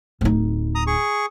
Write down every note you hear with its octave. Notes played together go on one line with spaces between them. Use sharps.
D1 D#4
A#5 D#6
G#4 C#6